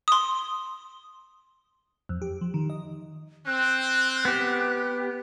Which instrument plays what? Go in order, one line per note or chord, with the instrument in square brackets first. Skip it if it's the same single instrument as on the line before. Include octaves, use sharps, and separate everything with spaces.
[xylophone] C6 D#6
[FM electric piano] F2
G4
F3
D#3
D#5
[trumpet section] C4 [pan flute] F#6
[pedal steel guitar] B3 G4